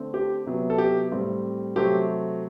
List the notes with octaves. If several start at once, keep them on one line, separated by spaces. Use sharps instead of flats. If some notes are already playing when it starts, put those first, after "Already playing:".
Already playing: D3 A3 C4
G4
C3 F#3 B3
A4
G4
A2 G3 C4
C3 F#3 A3 C4 G4